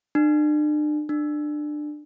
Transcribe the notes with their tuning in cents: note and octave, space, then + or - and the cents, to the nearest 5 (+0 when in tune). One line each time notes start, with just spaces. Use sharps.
D4 +40
D4 +25